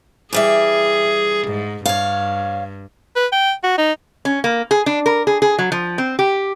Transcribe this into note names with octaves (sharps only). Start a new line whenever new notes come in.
E3 G3 G#4 E5
G#2
G2 C#5 F5
B4
G5
F#4
D#4
C#4
A#3
G#4
D4
A#4
G#4
G#4
F#3
F3
C4
G4